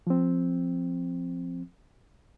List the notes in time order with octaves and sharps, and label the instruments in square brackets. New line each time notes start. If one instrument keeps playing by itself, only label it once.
[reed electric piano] F3 C4